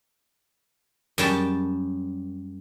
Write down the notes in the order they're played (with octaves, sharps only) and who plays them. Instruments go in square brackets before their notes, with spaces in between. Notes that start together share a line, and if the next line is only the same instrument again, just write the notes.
[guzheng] F#2 G3 A5